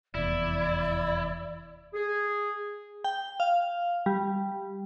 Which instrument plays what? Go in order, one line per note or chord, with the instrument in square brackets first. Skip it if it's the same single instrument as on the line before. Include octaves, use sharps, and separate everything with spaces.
[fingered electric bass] F1 E2 [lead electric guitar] E4 [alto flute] D5
[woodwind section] G#4
[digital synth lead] G5
F5
G3